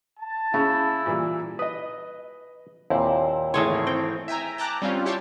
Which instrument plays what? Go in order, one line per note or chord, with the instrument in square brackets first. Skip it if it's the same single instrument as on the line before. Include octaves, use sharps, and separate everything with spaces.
[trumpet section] A5
[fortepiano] C#3 [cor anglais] E4
[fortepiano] A#2 E3 G3
[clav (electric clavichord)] B4 [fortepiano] D#5 D#6
[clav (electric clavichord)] D#2 A#2 [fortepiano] C4 E4
[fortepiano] G#1 G#4 C6 [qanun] E3 A3 C#5
[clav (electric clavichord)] C4 [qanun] G5
[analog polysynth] E5 G5 G#5 A#5
G5 A5 A#5 D6 F#6
G3 C4 C#4 F4
E4 G4 C#5 G5 A5 C6